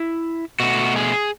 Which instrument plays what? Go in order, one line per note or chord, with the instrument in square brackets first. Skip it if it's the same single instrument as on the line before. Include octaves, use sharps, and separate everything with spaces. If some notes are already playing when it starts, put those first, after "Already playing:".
Already playing: [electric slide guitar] E4
B2 A3 F#4
G#4